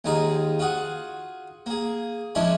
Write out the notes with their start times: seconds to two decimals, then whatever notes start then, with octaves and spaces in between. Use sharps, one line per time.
0.05 D#2 G#2 D#4 F4 G#4 A#5
0.59 F4 F#4 G#4 F#5
1.66 A#3 G#4
2.35 F3 G#3 C#4 D4 E4 C#5